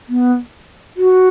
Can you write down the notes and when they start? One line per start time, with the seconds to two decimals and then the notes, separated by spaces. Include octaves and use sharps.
0.08 B3
0.96 F#4